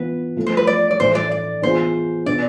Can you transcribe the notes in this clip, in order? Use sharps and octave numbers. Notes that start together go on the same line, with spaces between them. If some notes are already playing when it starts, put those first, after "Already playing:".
Already playing: E3 B3 F4 B4
F3 A3 E4 A4
C5
B4
D5
D5
A2 E3 A3 E4 C5
D5
D5
E3 B3 F4 G#4 C5
B2 B3 D5